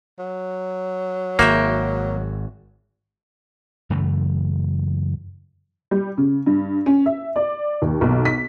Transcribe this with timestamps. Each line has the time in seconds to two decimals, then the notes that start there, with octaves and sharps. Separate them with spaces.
0.19 F#3
1.39 G#1 A#3 F#4 E5 G5
3.90 F#2 C#3 E3 A3
5.91 G3
6.18 C#3
6.46 G2
6.86 C#4
7.06 E5
7.36 D5
7.82 D#2
8.01 B1
8.25 B6